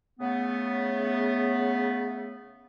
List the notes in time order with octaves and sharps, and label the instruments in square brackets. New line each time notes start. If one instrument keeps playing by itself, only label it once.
[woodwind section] C#3 A3 B3